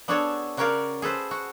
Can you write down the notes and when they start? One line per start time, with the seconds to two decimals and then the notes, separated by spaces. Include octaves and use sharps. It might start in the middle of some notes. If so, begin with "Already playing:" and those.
0.08 B3 D4 F#4 G#4 A4 C#5
0.57 C#3 F#4 A#4 C#5 D5 F5
1.02 G#4 A4 B4 C5
1.31 F#4